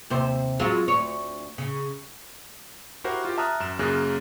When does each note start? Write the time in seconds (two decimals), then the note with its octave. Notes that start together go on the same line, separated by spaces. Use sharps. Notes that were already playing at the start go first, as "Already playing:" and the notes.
0.10 D#2 C3 C5
0.59 F#3 G#3 F4
0.88 D2 C#5
1.58 C#3
3.04 E4 F#4 G4 A#4 C5 F#5
3.25 F4 G4
3.37 E5 A5 A#5 D#6 F6 F#6
3.60 F#2 E7
3.79 F#2 C#3 A#3 G#4 F#6